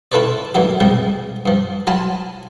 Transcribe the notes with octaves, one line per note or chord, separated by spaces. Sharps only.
E4 F4 A4 B4 C#5 D5
D2 A#2 E3 F#3 G4
C3 F3 G3 G#3
G2 F3
F#3 F4 G#5 A5 B5